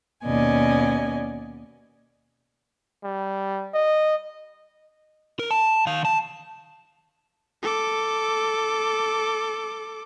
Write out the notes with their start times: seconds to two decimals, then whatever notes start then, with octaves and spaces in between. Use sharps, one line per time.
0.25 D#2 B2 C#4 D5 D#5 G#5
3.04 G3
3.74 D#5
5.39 A#4
5.51 A5
5.87 D#3 F5
6.05 A5
7.63 A4 D6